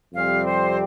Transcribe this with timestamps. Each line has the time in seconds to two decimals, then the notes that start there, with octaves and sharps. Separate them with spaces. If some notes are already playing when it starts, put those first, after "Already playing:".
0.14 F2 C3 G3 C4 G4 F5
0.46 C5